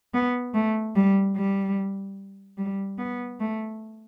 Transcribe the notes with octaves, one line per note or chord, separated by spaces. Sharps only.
B3
A3
G3
G3
G3
B3
A3